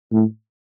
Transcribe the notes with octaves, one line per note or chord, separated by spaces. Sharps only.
A2